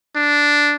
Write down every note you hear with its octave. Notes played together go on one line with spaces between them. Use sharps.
D4